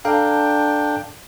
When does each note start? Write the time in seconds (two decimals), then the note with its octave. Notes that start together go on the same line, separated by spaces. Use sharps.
0.05 D4 A4 F5 G5 A#5